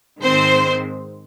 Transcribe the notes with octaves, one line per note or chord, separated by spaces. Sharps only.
G#2 D#3 G#3 C4 C5